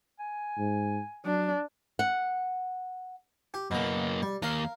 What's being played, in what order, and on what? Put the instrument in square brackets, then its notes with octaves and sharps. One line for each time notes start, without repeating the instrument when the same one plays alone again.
[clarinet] G#5
[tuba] G#2
[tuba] F#3 [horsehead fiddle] D4
[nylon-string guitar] F#5
[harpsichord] G4
[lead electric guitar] F#2 A#3 [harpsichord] B2 D6
[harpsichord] G3
[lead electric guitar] D#2 A#3 [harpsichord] A#4 F5